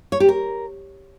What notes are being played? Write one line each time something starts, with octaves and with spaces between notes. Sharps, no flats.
C#5
G4
A#4